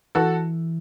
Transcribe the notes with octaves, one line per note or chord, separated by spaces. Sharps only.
E3 F#4 A4